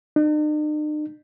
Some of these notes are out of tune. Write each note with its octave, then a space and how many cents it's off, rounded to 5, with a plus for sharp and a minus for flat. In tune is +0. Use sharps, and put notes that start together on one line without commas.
D#4 -45